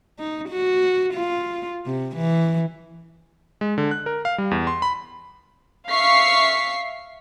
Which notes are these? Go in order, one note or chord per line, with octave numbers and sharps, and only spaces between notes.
D#4
F#4
F4
C3
E3
G#3
D3
F#6
A#4
F5
G3
E2
C6
B5
E5 F5 C#6 B6 C7